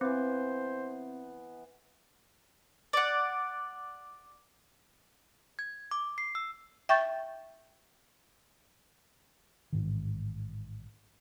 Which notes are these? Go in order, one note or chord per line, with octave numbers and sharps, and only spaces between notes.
E3 B3 C4 C5
D5 F#5
G#6
D6
C7
E6
E5 G5 C#6 G6 A6
A1 G#2 D#3